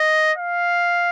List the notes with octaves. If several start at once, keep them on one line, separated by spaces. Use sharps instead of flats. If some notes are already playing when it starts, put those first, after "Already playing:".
Already playing: D#5
F5